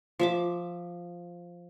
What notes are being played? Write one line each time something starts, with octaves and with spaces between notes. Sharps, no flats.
F3 E5 D6